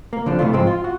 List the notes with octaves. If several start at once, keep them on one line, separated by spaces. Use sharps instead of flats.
A#3
D3 F3 D4
C3 E3 A3 F4
G#2 F3 G#3 C4
F4
F#4